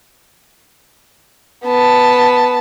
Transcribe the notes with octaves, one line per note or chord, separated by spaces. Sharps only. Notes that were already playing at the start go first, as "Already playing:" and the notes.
B3 A5